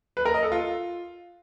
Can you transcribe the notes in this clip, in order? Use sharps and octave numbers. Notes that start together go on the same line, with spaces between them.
B4
A#4
D#5
A4
F4